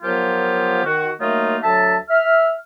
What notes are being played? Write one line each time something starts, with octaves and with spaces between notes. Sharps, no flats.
F3 F#3 B3 F4 G4 A#4
D#3 F#4
F#3 A3 A#3 D#4 F4 A#4
D2 F#3 E5 A5
E5 F6